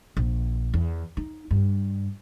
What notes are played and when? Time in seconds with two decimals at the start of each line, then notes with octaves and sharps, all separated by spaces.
0.17 A#1
0.74 E2
1.17 D#4
1.51 G2